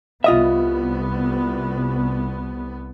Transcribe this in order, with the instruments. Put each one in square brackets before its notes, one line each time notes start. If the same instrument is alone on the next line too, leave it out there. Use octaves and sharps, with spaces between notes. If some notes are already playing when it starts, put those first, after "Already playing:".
[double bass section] C2 B3 [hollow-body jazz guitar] F4 D#5 E5